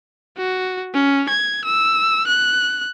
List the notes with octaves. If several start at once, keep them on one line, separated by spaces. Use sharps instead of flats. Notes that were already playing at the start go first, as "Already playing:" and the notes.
F#4
C#4
G#6
E6
F#6